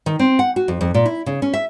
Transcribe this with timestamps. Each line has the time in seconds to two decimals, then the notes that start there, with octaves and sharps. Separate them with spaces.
0.06 D#3
0.19 C4
0.39 F#5
0.56 F#4
0.68 F2
0.81 F2
0.94 A#2
1.06 E4
1.26 C#3
1.42 C#4
1.54 E5